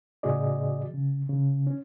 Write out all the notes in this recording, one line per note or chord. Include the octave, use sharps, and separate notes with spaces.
A2 C#3 F#4 G#4 D5 D#5
C#3
C#3
C#4